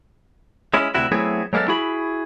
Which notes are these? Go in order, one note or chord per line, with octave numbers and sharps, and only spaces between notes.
G#3 C#4 E4
D2 C3 E4 F#4
F#3 A3 B3 C4 E4 G#4
F#3 G#3 A#3 B3 A4
E4 F#4 G#4 B5